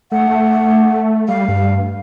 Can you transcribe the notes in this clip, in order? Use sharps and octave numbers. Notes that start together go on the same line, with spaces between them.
A3 F#5
G3 F5
G2